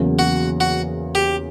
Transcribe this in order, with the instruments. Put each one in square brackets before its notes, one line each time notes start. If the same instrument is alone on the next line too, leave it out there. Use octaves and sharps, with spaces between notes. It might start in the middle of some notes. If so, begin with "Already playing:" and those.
Already playing: [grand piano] E2 C#3 F#3 A#3
[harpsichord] F#4
F#4
G4